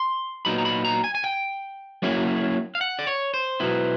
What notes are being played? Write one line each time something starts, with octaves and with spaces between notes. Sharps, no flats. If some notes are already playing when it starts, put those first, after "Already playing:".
Already playing: C6
A#2 F#3 B3 D#4 B5
A#5
B5
A#5
G#5
G#5
G5
F#3 A#3 C#4 E4
F5
F#5
D5
C#5
C5
B2 F#3 B3 E4